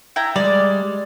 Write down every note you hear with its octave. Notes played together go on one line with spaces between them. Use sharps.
E4 G5 A#5
G3 G#3 D5